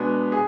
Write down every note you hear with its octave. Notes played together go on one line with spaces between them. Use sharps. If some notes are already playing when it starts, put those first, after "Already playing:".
Already playing: B2 G#3 B3 D4
G#4